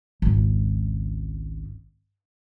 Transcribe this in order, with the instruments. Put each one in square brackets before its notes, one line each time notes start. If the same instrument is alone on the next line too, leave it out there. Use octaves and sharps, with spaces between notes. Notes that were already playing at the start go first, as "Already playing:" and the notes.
[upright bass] G#1 C#2